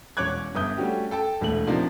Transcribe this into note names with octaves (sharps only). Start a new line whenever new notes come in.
E1 C#4 C#5 D6 F#6 G#6
G1 E5 D#6 G6
G3 A3 C#4 F#4 G4
A4 G5 A5
E1 D2 A3 F#7
C3 F3 A#3 D4 D#4